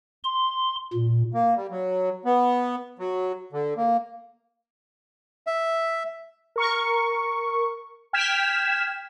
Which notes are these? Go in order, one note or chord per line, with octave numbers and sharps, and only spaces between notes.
C6
A#2
A#3
G3
F#3
B3
F#3
D3
A#3
E5
A#4 C#6
G5 F6 G#6 B6 E7